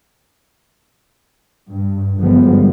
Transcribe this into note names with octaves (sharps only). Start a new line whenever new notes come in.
G2
G1 F#2 F3 G3 G#3 B3